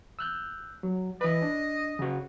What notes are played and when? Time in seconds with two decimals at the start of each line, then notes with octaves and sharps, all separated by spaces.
0.19 E6 F#6 G6
0.83 F#3
1.21 E3 B4 D#5
1.42 D4
1.99 C#3 F#4